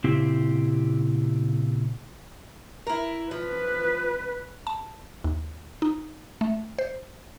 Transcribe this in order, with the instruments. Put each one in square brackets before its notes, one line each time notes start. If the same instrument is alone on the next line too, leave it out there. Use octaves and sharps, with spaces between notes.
[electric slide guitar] A#2 C#3 C4 E4 G4
[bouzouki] E4 A#4
[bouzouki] F3 [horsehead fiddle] B4
[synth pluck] A5
D#2
D#4
A3
C5